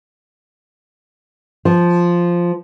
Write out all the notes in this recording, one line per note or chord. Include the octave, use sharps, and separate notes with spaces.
F3